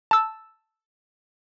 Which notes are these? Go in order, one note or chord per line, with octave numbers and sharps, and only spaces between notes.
A5 E6